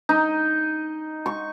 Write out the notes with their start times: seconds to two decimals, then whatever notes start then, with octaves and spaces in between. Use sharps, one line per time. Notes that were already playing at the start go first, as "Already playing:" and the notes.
0.09 D#4
1.26 C#6